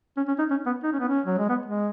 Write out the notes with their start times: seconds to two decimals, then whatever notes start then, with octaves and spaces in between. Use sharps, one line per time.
0.17 C#4
0.28 C#4
0.39 D#4
0.50 C#4
0.66 B3
0.83 D#4
0.92 C#4
1.00 B3
1.08 C#4
1.26 F#3
1.38 G#3
1.49 B3
1.66 G#3